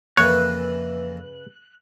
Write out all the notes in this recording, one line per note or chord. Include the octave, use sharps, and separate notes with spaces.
F2 C#3 E3 A#3 B4 C#5 F#6